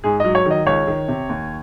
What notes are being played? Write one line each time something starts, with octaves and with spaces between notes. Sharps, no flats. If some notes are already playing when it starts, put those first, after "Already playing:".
G#2 G#4
F#3 D#5
C#5
D#3
D#5
C#2 C#5
D#3
C3
D#2